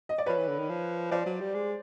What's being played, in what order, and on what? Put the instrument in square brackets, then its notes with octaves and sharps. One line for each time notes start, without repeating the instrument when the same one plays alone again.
[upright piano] D#5
D5
[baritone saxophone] F3 [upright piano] B4 C#5
[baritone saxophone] E3
D3
D#3
F3
[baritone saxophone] F3 [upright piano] C5 D5
[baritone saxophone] F#3
G3
G#3